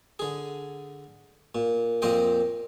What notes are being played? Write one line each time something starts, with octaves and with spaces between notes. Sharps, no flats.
D3 G#4
A#2
F2 A#2 C4 C5 D#5 G5